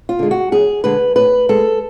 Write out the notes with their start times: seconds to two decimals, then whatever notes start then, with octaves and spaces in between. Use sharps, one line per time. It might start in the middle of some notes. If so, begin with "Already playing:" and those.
0.09 F4
0.19 D3 G#3
0.31 F#4
0.52 F#2 G#4
0.84 D3 G#3 B4
1.16 A2 B4
1.49 G#3 A4